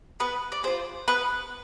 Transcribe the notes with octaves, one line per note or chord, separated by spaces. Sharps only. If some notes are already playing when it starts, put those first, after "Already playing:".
B3 B4
D5
F4 G#4 C5
B3 B4